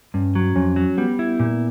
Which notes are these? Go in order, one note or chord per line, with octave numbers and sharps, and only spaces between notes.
G2 C#4
F#3
F2 C#4
F#3
G3 B3
E4
A#2